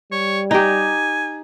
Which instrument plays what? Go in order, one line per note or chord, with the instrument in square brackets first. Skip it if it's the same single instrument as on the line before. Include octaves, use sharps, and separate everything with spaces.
[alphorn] G3 [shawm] C#5
[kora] D#4 G4 [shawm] G#5